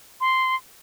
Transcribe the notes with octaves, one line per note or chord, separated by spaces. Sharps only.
C6